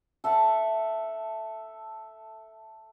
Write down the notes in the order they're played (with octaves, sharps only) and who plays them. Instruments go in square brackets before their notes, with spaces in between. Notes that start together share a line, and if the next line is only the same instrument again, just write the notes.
[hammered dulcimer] A4 E5 F#5 A5